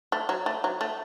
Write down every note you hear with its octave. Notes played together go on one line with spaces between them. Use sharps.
A3
F#3
A3
F#3
A3